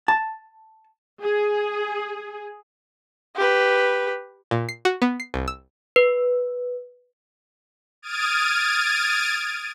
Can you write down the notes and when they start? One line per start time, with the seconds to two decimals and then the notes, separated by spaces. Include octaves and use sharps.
0.08 A5
1.22 G#4
3.36 G4 B4
4.51 A#2
4.69 C7
4.85 F#4
5.02 B3
5.20 C7
5.34 C2
5.48 E6
5.96 B4
8.02 D#6 F6 G#6 A6 D7 D#7